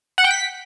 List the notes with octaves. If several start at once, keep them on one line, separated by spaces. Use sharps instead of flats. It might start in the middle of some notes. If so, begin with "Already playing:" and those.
F#5
G5
B6